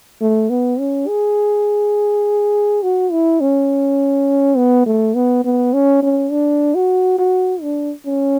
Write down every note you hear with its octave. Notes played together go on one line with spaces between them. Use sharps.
A3
B3
C#4
G#4
F#4
E4
C#4
B3
A3
B3
B3
C#4
C#4
D4
F#4
F#4
D4
C#4